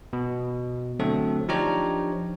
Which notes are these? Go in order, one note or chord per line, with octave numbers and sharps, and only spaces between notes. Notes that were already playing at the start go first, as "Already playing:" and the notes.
B2
D3 F#3 A3 C4 A4
F3 D4 D#4 G4 C#5 A#5